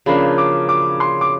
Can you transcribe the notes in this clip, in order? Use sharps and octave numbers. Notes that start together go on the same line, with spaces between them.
C#3 F3 A#3 D4 B5
D6
D6
C6
D6